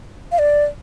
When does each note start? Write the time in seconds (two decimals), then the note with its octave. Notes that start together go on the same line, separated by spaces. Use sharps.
0.32 F5
0.39 D5